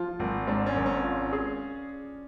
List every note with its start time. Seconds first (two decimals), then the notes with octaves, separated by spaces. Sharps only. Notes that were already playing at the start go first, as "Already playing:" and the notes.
Already playing: F3 F4
0.20 G#1
0.47 G#2 D4
0.66 C#4
0.76 G#1
0.86 C#4
1.04 F4
1.33 G#4